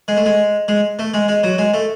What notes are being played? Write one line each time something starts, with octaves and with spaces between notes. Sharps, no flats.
G#3
A3
G#3
G#3
A3
G#3
G#3
F#3
G#3
A3